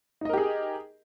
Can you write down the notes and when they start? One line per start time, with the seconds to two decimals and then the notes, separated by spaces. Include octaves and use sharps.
0.21 D#4
0.25 D#5
0.29 A#4
0.33 G4
0.38 G#4